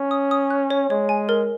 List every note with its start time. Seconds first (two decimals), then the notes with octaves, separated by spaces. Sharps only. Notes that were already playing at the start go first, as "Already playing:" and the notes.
Already playing: C#4
0.11 D#6
0.31 D#6
0.50 F#6
0.70 C#5
0.90 G#3 C#5
1.09 G#5
1.29 A#4